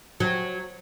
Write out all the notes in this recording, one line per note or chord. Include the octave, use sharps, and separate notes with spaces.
F#3